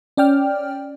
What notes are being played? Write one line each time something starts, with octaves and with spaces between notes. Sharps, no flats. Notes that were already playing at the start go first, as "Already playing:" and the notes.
C#4 D5 G5 F6